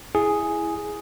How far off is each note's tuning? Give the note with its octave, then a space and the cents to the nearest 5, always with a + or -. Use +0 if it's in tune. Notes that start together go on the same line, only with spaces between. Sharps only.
E4 +0 G#4 +0